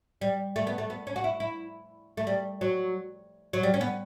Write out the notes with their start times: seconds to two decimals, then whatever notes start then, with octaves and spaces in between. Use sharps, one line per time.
0.21 G3
0.56 A3
0.67 B3
0.78 A3
0.90 B3
1.07 C#4
1.16 F#4
1.24 E4
1.40 E4
2.17 A3
2.27 G3
2.61 F#3
3.53 F#3
3.63 G3
3.74 C#4
3.81 B3